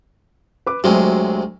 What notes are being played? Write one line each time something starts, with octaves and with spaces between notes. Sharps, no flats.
B4 D6
D2 C3 F#3 G#3